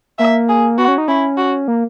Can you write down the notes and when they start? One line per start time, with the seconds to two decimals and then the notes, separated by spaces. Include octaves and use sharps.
0.19 A#3 E5
0.49 G#4
0.78 B3 F#4
0.88 C#4
0.98 D#4
1.08 C#4 E4
1.38 F#4
1.68 A#3